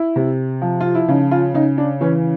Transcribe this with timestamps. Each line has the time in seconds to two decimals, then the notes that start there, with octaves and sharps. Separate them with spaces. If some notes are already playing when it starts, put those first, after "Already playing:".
Already playing: E4
0.16 C3
0.62 F3
0.81 F4
0.95 E4
1.08 C#3 D#4
1.31 F4
1.54 C#3 D#4
1.78 D4
2.01 E3 C#4